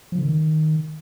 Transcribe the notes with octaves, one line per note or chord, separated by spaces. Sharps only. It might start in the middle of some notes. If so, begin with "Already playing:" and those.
F3
D3
D#3